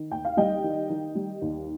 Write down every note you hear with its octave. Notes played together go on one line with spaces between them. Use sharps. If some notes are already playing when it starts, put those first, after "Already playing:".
Already playing: D#3
D#2 G5
F5
G3 D#5 G5
D#3
D#3
G3
D#2